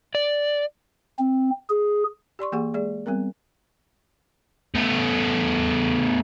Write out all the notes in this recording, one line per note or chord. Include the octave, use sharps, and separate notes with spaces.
D5
C4
G#4
G4 D5 C6 C#6
E3 A#3 G4 G#4 F#5 C#6
G#3 G#4 D5
G3 B3 C4 A#4
A3 B3